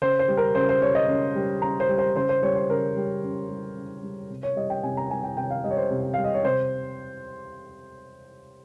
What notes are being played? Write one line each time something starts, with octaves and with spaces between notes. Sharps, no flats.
C#3 C5
C5
G3
A#4
C#3 C5
C5
G3 C#5
D#5
C#3
G3
C#3 A#5
C5
G3
C5
C#3 C5
C5
G3 C#5
C5
C#3 A#4
G3
C#3
G3
C#3
G3
C3
C#5
G3 D#5
G5
C3 G#5
A#5
G3 G#5
G5
C3 G5
F5
G3 D#5
C#5
C5
C3
G3 F5
D#5
C#5
C3 C5